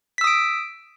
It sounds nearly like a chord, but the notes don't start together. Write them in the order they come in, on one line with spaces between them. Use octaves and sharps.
B6 E6 D#6 D7